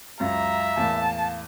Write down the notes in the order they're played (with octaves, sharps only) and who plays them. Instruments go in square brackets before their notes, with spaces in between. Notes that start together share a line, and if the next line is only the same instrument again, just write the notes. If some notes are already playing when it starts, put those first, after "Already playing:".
[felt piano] C#2 F#2 [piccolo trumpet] E5 [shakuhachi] F5 [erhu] A#5
[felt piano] E2 A2 A#3 [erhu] A5